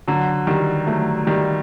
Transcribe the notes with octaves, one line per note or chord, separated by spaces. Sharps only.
D3 F#3
D#3 G3
F#3 A3
D#3 G3